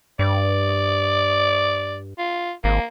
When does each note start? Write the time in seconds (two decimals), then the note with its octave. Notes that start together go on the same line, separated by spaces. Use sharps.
0.19 G2 D5
2.18 F4
2.64 G#1 A#3